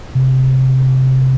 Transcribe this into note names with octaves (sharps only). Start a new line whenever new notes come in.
C3